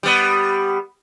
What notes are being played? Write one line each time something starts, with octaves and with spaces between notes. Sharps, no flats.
G3 B3